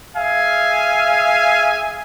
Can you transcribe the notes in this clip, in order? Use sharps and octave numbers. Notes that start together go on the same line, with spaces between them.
G#4 E5 F5 G#5